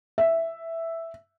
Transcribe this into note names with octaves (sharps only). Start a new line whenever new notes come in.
E5